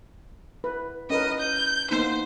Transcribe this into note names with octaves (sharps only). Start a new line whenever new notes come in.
B4
C#4 A#4 B4 D#5
G6
A#3 B3 D#4 C5